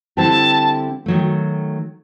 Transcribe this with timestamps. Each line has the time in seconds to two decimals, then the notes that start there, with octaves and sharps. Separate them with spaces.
0.17 D3 G3 C4 E4 G4 A5
1.06 D#3 F#3 A3